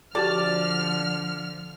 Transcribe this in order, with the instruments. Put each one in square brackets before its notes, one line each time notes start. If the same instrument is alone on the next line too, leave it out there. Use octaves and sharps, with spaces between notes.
[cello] D3 F3 [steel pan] F#4 G4 A5 [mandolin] D5 [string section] F6